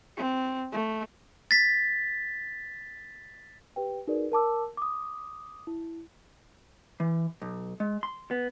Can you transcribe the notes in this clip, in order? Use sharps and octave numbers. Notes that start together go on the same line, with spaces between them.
C4
A3
A6 B6
G4 B4 G5
D#4 F#4 G#4 A#4 B4 D5
A#4 A5 D6 E6
D6 D#6
E4
E3
B1
G#3
C6
B3